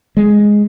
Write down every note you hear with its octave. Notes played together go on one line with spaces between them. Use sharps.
G#3